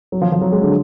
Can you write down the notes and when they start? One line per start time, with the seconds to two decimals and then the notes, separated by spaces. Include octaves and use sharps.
0.12 F#3
0.22 F3
0.32 F3
0.41 F#3
0.52 G#3
0.62 D3